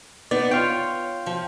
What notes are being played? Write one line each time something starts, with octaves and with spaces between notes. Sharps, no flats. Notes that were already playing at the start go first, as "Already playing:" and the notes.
B3 D#4 D5
F4 C#5 F5 G5
F3